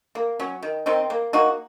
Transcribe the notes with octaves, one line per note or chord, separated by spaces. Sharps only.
A#3
F#3 C#4
D#3
D#3 C4 D#4
A#3
A#3 D#4 F#4